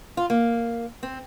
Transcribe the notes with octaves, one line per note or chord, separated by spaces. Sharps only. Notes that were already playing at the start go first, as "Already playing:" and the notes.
F4
A#3
C4